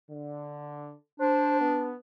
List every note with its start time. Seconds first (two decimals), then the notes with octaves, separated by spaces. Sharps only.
0.11 D3
1.20 D4 C5
1.60 B3